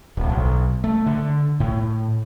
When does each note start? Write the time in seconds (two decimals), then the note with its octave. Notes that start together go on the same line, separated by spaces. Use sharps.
0.17 D1
0.30 B1
0.84 A3
1.06 D3
1.60 A2